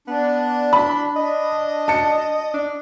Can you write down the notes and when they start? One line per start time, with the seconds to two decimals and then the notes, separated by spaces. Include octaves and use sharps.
0.08 B3 D4
0.73 B5
1.16 D4 D#5
1.88 A5 C#7
2.54 D4